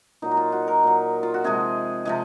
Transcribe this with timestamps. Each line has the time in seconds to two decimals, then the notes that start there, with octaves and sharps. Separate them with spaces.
0.22 A#2 F#3 D#4
0.31 F#4
0.37 F4
0.52 F#4
0.68 A#4
0.84 A#2 F#3
1.23 F4
1.34 F#4
1.44 C3 F3 G#3 G#4
2.05 C3 F3 G#3 G#4